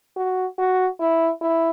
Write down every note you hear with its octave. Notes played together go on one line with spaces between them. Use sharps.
F#4
F#4
E4
E4